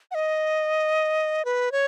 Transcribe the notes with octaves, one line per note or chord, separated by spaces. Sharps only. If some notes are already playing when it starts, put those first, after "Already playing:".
F#5
D#5
B4
C#5